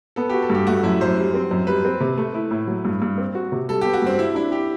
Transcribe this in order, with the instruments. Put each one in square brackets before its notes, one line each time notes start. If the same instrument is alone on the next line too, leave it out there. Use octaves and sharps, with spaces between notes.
[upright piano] B3 [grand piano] A4
[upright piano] F#4 [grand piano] G4
[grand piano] A4
[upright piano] G2 [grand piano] G4
[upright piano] A3 [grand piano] F#4
[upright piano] F#2 [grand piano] E4
[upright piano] F#2 [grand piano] C5
[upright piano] G3
C4
F#2
[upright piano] G3 [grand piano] B4
[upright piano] C4
C3
A3
E4
A2
F#3
G2
G2
C4
F#4
C3
[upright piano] G3 [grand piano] A4
[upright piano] B3 [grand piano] G4
[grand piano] F#4
[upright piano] G2 [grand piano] C4
[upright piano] G3 [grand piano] E4
[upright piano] D4 [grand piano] E4
[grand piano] G4